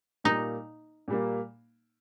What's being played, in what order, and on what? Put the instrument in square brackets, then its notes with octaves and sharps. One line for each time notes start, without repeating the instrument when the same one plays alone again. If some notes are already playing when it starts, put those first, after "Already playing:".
[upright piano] A#2 G3 A#3 [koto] D#4
[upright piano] A#2 G3 A#3